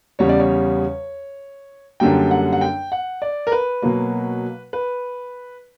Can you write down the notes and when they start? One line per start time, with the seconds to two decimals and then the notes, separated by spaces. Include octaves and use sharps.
0.19 E2 C#3 G3 C#5
0.29 D5
0.40 C#5
2.00 F#2 D3 G3 A#3 G5
2.31 F#5
2.53 F#5
2.61 G5
2.92 F#5
3.22 D5
3.47 A#4
3.52 B4
3.82 B2 F#3 A#3
4.73 B4